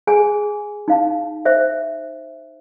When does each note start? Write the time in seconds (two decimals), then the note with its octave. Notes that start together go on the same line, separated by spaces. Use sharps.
0.07 G#4 G#5
0.88 D#4 F5 A5
1.45 C5 E5